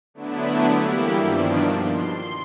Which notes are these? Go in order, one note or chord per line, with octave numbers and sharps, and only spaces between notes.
D3 F#3 A3 B3 D4 E4
E3 G3 A#3 E4 G4
G2 B2 D#3 F3 D4
C6